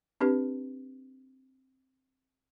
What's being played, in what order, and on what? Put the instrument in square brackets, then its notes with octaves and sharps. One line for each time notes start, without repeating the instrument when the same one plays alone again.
[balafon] C4 D4 G4 B4